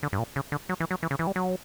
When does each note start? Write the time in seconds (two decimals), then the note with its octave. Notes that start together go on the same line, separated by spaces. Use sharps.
0.03 D3
0.13 G2
0.19 A#2
0.36 C#3
0.52 D3
0.69 F#3
0.80 E3
0.91 F#3
1.03 E3
1.11 C#3
1.19 E3
1.27 G3
1.36 F#3